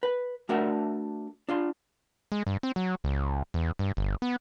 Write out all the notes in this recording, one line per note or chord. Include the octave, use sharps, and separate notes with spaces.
B4
A3 D4 F#4 A#4 D5 E5
D4 F4 C6
G#3
G2
C4
F#3
C#2
E2
G2
G1
B3